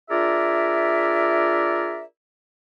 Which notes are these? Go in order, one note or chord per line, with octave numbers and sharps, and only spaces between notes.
D4 F4 G#4 A#4 D5 E5